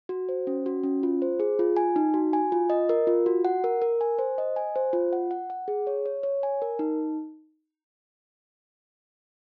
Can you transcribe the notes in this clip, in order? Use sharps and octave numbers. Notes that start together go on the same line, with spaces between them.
F#4
C5
C#4
F#4
C#4
F4
C5
G#4
F4
G#5
D#4
F#4
G#5
F4
D#5
A#4
F4
F#4
F#5
A#4
A#4
G#5
C5
D#5
G#5
C5
F4
F#5
F#5
F#5
G#4
C#5
C#5
C#5
G#5
A#4
D#4